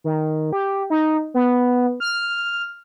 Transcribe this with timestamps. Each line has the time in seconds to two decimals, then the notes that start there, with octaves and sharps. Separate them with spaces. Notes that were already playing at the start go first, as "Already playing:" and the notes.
0.04 D#3
0.53 G4
0.90 D#4
1.34 B3
2.00 F6